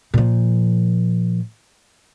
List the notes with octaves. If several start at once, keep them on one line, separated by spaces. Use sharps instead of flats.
A#2 F3